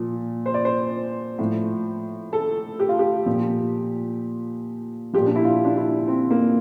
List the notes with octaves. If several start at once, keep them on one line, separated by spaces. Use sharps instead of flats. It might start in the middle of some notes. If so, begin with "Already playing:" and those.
Already playing: A#2 F3
C5
D5
C5
A2 F3
A4
G4
F4
G4
A#2 F3
A#2 F3 G4
D4
E4
F4
D4
E4
C4
A#3